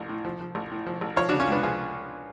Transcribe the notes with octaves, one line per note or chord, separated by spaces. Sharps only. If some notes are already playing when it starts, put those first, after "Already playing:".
Already playing: A1 F3
A2
F3
F3
A1
A2
F3
A1
F3 C#5 F5
C#3 D4 F#4
C#4 F4
C#2 B3 D4
F3 F4 G#4